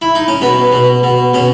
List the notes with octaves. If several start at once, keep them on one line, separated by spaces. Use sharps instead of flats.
E4
D#4
C#4
B2 B3
B2
B2
B2 C#4